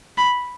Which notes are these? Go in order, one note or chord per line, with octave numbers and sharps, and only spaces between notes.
B5